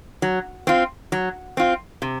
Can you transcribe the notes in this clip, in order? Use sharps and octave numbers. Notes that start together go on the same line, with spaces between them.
F#3
C4 F4
F#3
C4 F4
C3